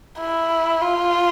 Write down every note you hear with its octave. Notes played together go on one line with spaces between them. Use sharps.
E4
F4